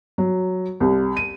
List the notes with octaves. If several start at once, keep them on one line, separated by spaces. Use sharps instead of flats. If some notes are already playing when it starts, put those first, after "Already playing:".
F#3
C2
D#7